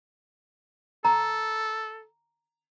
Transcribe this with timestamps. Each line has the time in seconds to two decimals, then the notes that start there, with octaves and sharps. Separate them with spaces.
1.05 A4 A#5